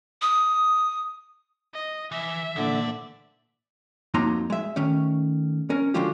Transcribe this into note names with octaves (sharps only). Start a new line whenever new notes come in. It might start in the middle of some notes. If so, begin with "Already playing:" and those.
D#6
D#5
E3 E5
D#2 A#2 D3 E3 F3 D5
F2 F#3 A#3 D#4 A#5 C6
G#3 E5
D#3 A3 C#4
C#4 A#4
D3 F3 F#3 G#3 F4 G4